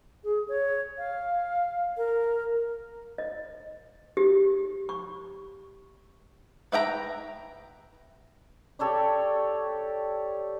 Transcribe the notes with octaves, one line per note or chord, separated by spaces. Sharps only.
G#4
C#5
F5
A#4
D#5
G4
C#6
B4 E5 G5 A#5
G4 A4 C#5 D5